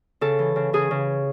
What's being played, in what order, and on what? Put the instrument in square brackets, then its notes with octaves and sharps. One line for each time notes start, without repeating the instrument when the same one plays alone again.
[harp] C#3 A4
E3
C#3
C#3 G#4
C#3